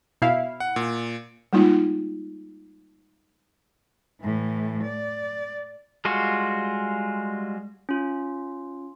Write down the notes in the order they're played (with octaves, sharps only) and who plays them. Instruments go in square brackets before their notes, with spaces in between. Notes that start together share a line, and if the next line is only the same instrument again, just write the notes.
[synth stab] B2 E4 F5
[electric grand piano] F#5
A#2
[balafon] G3 G#3 A#3 D#4 F4
[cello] A2 E3
D5
[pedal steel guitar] G3 G#3 F4 F#4
[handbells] C#4 F4